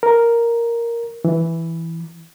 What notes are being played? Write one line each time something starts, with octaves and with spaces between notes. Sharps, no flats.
A#4
E3